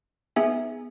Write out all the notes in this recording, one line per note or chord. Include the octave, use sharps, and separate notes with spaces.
B3 D#4 G#4 E5 G#5